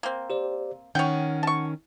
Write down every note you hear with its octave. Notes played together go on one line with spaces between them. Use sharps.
A#3 C4
G4 C5 D5
D#3 C#4 C#5 F#5 G5
A5 C#6